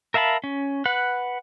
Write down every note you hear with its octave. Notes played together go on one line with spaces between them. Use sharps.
A#4 E5 F5 A5 B5
C#4
B4 F#5